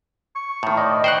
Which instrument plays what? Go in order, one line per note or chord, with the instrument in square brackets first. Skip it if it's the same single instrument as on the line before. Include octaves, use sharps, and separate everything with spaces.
[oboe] C#6
[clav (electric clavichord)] A2 D#3
[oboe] D5 [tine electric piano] D#5
[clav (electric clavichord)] C5 F#5 [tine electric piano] G5 F#6